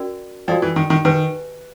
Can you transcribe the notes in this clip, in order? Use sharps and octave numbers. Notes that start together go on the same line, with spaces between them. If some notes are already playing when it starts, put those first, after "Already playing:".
Already playing: C#4 F#4 A#4 D5
F3 F#4 A4 D5 G5
E3
D#3
D#3
D#3 G4 B4 D#5 G#5